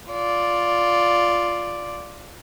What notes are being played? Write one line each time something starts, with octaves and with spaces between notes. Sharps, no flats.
F4 D5